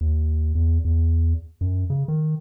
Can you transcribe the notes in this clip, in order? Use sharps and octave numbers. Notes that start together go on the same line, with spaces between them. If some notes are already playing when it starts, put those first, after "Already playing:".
D#2
E2
E2
F#2
C#3
D#3